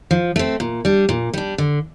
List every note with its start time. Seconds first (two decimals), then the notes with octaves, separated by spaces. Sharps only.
0.11 F3
0.36 A3 C4
0.60 A#2
0.85 G3 D4
1.09 A#2
1.34 G3 D4
1.58 D3